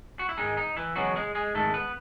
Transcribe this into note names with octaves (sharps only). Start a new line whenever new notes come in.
F#4
E4
G#2 D#3 G#3 D#4
D#4
E3 E4
E2 C#3 F#3 G#3 B3 F#4
G#3 G#4
G#3 G#4
G#2 D#3 G#3 A3 A4
B3 B4